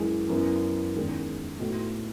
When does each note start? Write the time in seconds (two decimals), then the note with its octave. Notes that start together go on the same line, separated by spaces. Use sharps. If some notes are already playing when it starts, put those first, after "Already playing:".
Already playing: F#2 E3 G#3
0.29 F#2 E3 B3
0.95 E2 D#3 G#3 C#4
1.60 A2 E3 B3 D#4 F#4